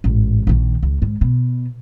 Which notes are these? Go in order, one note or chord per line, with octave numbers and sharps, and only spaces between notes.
A1 G#2
A#1 D#3
C#2
G#2
B2